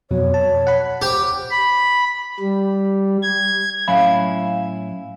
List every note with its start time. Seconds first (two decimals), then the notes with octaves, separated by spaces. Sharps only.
0.11 F2 B2 F#3 C#5
0.34 A5
0.67 F#5 B5
1.02 G4 C5
1.51 B5
2.40 G3
3.23 G#6
3.88 A2 F#3 C#4 E4 F5 B5